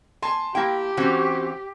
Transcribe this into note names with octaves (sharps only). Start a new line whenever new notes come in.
G#5 A5 C6
A#3 E4 G4 G5
E3 C4 C#4 F#4